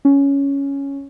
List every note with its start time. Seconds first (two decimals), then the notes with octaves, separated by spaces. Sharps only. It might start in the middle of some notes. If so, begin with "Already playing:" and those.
0.05 C#4